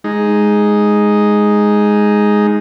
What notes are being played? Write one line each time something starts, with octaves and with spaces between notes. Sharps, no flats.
G#3 D#4